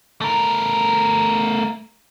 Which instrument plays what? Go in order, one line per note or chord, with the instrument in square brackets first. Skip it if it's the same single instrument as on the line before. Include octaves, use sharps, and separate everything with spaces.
[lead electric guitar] A3 A#4